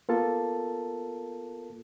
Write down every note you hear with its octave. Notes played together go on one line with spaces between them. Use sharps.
A#3 B3 F4 A4 A#4 A5